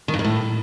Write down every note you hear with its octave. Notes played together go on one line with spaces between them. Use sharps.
D#3
G2
F#2
A2